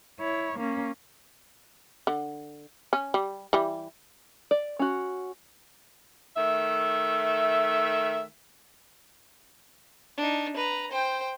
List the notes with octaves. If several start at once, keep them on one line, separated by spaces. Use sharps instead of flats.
E4 C#5
A#3 C#4
D3
C#4
G3
E3 G3
D5
C#4 F#4
D#3 A3 E5
D4 D#4
B4 A#5
C5 G5